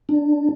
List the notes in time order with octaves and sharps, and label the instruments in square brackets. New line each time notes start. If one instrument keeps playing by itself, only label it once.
[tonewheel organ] D4